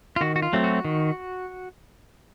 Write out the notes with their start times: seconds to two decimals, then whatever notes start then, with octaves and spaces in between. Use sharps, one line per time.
0.16 F4
0.21 D#3 F#4
0.36 F#4
0.42 F4
0.53 F#3 A3 C4
0.64 F#4
0.85 D#3